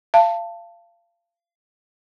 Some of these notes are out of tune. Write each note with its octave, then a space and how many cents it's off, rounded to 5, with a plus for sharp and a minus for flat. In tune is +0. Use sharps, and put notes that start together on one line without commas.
F5 -25 A5 +10